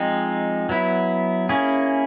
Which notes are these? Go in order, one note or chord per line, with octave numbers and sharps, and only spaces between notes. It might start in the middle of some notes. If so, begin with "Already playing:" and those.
Already playing: F3 G#3 C4 D#4
F#3 B3 E4
A#3 C#4 E4 G#4